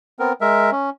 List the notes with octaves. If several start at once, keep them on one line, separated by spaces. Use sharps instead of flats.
B3 C4 A#4
G#3 A#4 E5
C#4